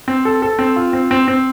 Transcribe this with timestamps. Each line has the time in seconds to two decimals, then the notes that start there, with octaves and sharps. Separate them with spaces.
0.08 C4
0.25 A4
0.42 A4
0.59 C4
0.76 F4
0.93 C4
1.11 C4
1.28 C4